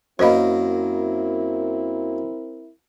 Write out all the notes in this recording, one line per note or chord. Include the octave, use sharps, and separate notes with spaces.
F#2 A#3 C4 E4 A#4 C5 D#5 B5